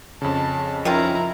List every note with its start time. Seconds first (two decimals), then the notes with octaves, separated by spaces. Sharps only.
0.22 F2 C#3 A5
0.85 D#3 F3 C#4 E4 F4 A#5